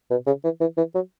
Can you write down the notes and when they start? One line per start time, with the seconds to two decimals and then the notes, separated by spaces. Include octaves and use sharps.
0.11 B2
0.26 C#3
0.44 E3
0.61 E3
0.77 E3
0.95 F#3